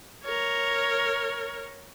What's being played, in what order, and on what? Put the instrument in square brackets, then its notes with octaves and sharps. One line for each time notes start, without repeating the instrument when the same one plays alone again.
[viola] A#4 C#5